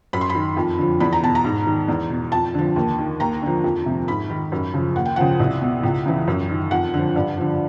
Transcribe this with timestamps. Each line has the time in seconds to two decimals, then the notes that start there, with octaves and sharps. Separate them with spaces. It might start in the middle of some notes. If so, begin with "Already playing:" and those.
0.13 F#2 B5
0.21 C6
0.30 B5
0.35 D#3
0.57 F2
0.78 D3 F3
1.00 E2 B5
1.13 A#5
1.23 B2 A5
1.35 A#5
1.44 G#2
1.66 D#3
1.88 E2
2.10 B2
2.32 F2 A5
2.54 D3 F3
2.76 D#2
2.98 D#3
3.20 D#2 A#5
3.42 D3 F3
3.64 F2
3.86 C3 F3
4.08 G#2 B5
4.29 D#3
4.52 F#2
4.74 C#3 F3
4.96 D#2 F#5
5.06 G5
5.16 C#3 F3 F#5
5.40 C2
5.62 B2
5.84 C#2
6.06 C#3 E3
6.27 F#2
6.49 D#3
6.71 F2 F#5
6.94 D3 F3
7.16 G2
7.37 D3 F3